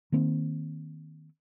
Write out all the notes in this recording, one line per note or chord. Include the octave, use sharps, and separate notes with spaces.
D#3 A#3 C4